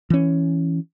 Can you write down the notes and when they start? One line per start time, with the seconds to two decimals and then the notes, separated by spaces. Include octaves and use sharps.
0.10 E3 C#4